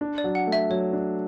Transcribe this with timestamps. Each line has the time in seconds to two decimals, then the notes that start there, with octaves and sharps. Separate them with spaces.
0.01 D4
0.18 D5
0.24 F#3
0.35 F#5
0.47 A3
0.52 E5
0.70 F#3 C#5
0.93 D4